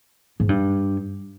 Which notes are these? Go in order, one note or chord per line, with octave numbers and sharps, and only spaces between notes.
G#2
G2